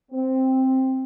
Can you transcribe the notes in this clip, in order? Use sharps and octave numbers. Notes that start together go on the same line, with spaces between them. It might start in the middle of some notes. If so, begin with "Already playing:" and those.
C4